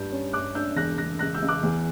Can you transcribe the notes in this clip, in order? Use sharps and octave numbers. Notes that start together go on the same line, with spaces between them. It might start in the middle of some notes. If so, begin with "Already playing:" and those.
Already playing: G2 G6
C#4
G2 D6 F#6
D4 E6 G6
E1 F#6 A#6
E1 F#6 A#6
C#2 F#6 A#6
E6 G6
C#2
D6 F#6
E2